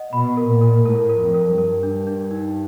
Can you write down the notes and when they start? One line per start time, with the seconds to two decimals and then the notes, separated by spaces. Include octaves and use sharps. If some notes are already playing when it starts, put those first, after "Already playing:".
Already playing: D#5 F#5
0.13 B2 B5
0.37 A#4
0.49 A#2
0.61 A#4
0.85 A2 A#4
1.10 A#4
1.22 F2
1.34 A#4
1.58 G2 A#4
1.83 D4
2.07 D4
2.31 D#4